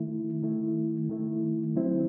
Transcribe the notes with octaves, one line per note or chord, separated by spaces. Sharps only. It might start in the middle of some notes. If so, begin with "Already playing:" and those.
Already playing: D#3 A3 E4
D#3 A3 E4
D#3 A3 E4
D#3 F#3 C4 E4